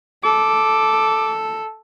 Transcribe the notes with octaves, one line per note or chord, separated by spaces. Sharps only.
A4 D6